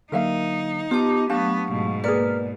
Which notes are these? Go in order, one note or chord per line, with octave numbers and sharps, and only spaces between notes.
D3 F#3 A#3 D#4 A#4 E5 F5
B3 F4 G4 A5 D6 D#7
F#3 A3 B3 D4 G4 F5 A5 C#6
G#2 B2
A#3 G#4 A#4 B4 D5 F6